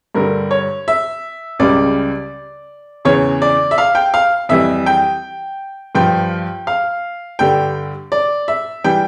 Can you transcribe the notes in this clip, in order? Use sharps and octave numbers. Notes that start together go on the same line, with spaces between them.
G2 D3 G3 A#4
C#5
E5
C#2 C#3 G3 D5
E2 C#3 E3 C#5
D5
E5
F5
G5
F5
F2 E3 G3 E5
G5
G2 F3 G5
F5
G2 D3 G3 G5
D5
E5
E3 G3 G5